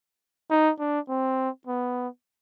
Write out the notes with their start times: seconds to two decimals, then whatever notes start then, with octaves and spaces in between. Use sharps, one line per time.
0.50 D#4
0.79 D4
1.09 C4
1.67 B3